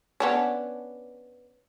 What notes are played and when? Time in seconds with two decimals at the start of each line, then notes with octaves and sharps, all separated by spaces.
0.20 B3 C#4 D4